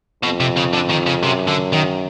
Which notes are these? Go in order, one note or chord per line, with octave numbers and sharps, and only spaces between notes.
F2 B2
C3
C#3
D3
D#3
C#3
F#2 C3
D3
D#3